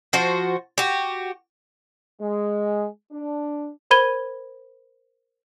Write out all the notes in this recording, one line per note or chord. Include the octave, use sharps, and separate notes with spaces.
F3 F#4 C5
F#4 G4
G#3
D4
A#4 C5 B5 G#6 D#7 G7